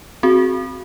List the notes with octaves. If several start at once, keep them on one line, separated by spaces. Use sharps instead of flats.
C4 F#4 G#4